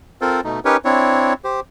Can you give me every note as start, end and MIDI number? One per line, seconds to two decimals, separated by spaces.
0.21 0.41 60
0.21 0.41 65
0.21 0.41 69
0.21 0.41 70
0.21 0.41 72
0.44 0.60 47
0.44 0.60 57
0.44 0.60 63
0.65 0.77 61
0.65 0.77 63
0.65 0.77 67
0.65 0.77 70
0.65 0.77 71
0.65 0.77 73
0.85 1.33 60
0.85 1.33 62
0.85 1.33 64
0.85 1.33 73
1.44 1.60 67
1.44 1.60 72